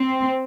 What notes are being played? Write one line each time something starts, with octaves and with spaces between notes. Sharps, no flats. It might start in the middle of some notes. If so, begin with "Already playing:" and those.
Already playing: C4